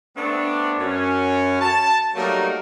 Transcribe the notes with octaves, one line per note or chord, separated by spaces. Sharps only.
A3 B3 C4 D4
F#2 C#4
A5
F#3 G3 A3 A#3 D#4 A#4